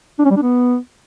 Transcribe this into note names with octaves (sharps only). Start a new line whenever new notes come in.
D4
C#4
G3
D4
B3